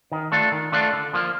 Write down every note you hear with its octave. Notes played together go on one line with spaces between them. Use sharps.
D#3
A3 D4 F4 A4
D#3
A3 D4 F4 A4
D3
F3 A#3